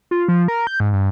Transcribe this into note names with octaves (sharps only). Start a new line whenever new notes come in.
F4
F3
A#4
G6
G#2
G2